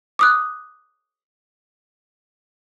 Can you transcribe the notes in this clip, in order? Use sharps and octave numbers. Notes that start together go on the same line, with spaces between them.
D6 D#6 F#6